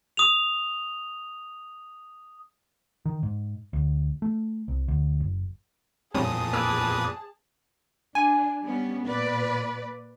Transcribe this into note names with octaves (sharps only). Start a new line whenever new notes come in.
D#6 F7
D#3
G#2
D2
A3
C2
D2
F#1
F2 A#2 G3 C4 C#4 G#4 A5 D#6
A#3 B4 D5 E6 D7
D4 G#5
G3 B3 C#4
A#2 B4 D5